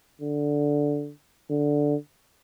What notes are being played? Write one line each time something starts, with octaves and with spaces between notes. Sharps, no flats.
D3
D3